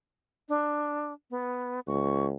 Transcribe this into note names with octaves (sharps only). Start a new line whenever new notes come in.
D4
B3
C#2 C#6